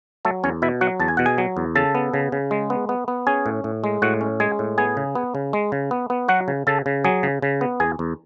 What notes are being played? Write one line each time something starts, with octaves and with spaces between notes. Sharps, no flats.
F#3 A3 A4
E2 C#4 C#5
B2 E4 E5
F#3 F#4 F#5
E2 A5
G#5
B2 F#5
G#4 G#5
F#3
E2
C#3 A4 A5
B3
C#3
C#3
G#3
B3
B3
B3
C#4 G#4 G#5
A2
A2
G#3
A2 F#4 F#5
C#4
G#3 G#4 G#5
A2
B3 G#4 G#5
C#3
B3
C#3
G#3
C#3
B3
B3
F#3 F#4 F#5
C#3
C#3 A4 A5
C#3
F#3 G#4 G#5
C#3
C#3
B3
E2 G#4 G#5
E2